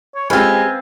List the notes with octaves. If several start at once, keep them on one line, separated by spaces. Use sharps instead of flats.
C#5
G#3 C4 F4 G4 B4 G#5